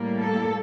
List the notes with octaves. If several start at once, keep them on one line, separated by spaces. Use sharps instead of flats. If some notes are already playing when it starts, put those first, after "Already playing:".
Already playing: A2 G3 A#3
A4